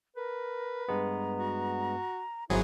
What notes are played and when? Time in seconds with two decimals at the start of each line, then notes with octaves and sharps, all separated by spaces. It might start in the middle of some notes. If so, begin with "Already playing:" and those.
0.16 A#4 B4
0.88 G2 G#3 B3 A#5
1.38 F#4
2.50 G#1 F#3 E4 G#4 C5